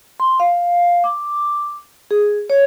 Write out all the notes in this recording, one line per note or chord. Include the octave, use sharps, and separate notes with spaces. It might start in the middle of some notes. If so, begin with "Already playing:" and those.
C6
F5
D6
G#4
C#5